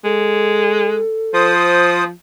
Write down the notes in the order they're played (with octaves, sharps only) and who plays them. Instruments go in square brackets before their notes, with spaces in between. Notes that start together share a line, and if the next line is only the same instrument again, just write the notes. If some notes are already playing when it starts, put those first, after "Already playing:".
[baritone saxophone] G#3 [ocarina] A4
[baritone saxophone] F3 [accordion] C5 D#6